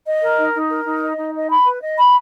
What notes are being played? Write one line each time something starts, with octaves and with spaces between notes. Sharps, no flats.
D#5
A#4
D#4
D#4
A#4
D#4
D#5
D#4
D#5
B5
B4
D#5
B5